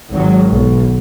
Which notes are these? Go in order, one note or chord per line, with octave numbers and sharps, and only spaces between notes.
G#1 F#3
B1